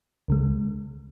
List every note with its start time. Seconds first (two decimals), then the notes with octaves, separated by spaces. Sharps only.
0.28 C#2 C#3 G#3